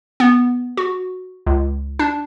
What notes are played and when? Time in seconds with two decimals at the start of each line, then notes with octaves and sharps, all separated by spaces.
0.20 B3
0.77 F#4
1.46 C#2
1.99 D4